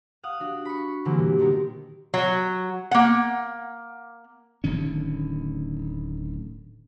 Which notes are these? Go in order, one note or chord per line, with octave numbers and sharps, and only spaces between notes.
F5 F#5 D#6
D4 F#4
B5 C#6
D3 E3 F#3 G3 A#3 C4
A#2
D3 D#3 B3 A#4
F#3 F#4
A#3 F#5
D1 D2 D#3 C#4